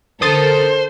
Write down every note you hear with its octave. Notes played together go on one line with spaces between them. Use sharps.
D3 A4 A#4 C5 D#6 A6